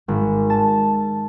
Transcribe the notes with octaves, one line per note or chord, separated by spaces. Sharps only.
G#1
A5